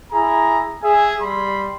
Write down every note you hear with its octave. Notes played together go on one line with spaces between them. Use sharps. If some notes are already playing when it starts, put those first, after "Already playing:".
E4 G#4 A#5
G#4 E5 G#5
G3 B5 C6